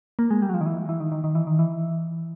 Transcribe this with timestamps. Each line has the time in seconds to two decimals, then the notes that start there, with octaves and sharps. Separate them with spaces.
0.19 A#3
0.31 G#3
0.42 G3
0.49 F#3
0.54 F3
0.61 D#3
0.66 E3
0.89 E3
1.00 D#3
1.12 D#3
1.24 D#3
1.35 E3
1.47 D#3
1.59 E3